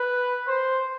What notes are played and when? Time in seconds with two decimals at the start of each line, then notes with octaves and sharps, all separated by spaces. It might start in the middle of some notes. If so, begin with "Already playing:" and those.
Already playing: B4
0.47 C5